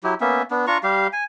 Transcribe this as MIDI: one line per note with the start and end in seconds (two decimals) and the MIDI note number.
0.04 0.14 54
0.04 0.14 64
0.04 0.14 67
0.21 0.42 58
0.21 0.42 59
0.21 0.42 61
0.21 0.42 76
0.51 0.66 59
0.51 0.66 62
0.67 0.78 62
0.67 0.78 65
0.67 0.78 82
0.67 0.78 85
0.83 1.07 55
0.83 1.07 67
0.83 1.07 77
1.13 1.24 80